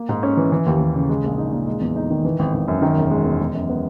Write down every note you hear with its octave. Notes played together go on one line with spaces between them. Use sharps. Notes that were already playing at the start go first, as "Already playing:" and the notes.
Already playing: A#3
G#2
C#4
E3
E3
D#2
D#2
C#3
G#3
A#1
D#4
A#2
G#3
E2
D#4
D#3
E3
G#1
G#1
F#2
D#3
E1
G#3
E2
G#3
F#2
B3